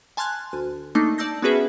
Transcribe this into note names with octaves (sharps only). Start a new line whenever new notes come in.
G#5 A5 C6 F6 F#6 G#6
D2
A3 A#3 D4 D#4
D5 A5 E6 G6 A#6
B3 C#4 F#4 G#4 B4 E5